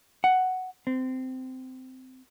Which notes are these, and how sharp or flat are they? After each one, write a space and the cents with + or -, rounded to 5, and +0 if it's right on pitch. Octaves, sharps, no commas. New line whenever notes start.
F#5 +5
C4 -15